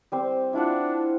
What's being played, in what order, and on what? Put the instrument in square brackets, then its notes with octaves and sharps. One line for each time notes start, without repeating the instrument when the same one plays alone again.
[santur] G3 C4 C5
[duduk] D4 [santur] E4 F4 F#5